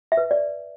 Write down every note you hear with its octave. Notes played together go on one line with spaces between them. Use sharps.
E5
B4
D5